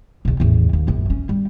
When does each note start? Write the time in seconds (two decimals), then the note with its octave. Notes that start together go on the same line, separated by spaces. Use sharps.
0.25 B1 E2
0.40 A1 E2
0.73 D#2
0.87 A#1 F#2
1.10 C#4
1.29 G3